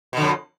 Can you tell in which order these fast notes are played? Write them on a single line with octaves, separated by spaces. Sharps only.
B2 D3 F2